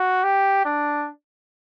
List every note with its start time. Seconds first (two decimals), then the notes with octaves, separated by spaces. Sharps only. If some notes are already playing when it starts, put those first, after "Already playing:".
Already playing: F#4
0.24 G4
0.65 D4